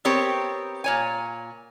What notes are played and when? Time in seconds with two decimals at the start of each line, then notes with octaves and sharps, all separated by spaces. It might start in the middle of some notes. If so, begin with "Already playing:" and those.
0.05 B3 C4 G4 A#4 C#5
0.84 A#2 C#5 G#5